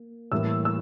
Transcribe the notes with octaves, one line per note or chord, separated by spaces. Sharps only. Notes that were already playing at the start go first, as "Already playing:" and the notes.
Already playing: A#3
A2 E3 G3 A#3 E6
E6